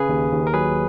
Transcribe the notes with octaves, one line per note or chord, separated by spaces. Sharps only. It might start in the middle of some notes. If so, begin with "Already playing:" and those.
Already playing: C#3 G#4 B4
D#2
D#2
A#4
F#3 G#4 B4